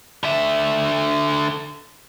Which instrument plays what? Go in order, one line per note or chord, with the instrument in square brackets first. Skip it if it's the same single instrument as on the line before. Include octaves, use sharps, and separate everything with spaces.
[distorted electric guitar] D3 E5